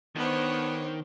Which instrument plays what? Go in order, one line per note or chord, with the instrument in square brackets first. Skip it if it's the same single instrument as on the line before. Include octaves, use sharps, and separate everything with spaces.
[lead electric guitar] D#3 [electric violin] B3 [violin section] D4 C5 C#5